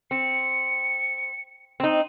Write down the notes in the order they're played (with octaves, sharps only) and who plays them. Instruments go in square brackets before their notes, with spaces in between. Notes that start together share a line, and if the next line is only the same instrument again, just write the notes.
[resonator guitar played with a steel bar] C4 [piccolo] C#7
[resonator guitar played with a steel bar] C4 D#4